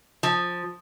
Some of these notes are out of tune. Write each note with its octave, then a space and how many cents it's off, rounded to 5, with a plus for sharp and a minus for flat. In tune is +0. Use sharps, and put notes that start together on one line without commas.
F3 +15